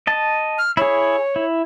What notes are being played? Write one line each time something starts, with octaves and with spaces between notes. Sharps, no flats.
D#5 A5
F6
E4 G#4 C#5
E4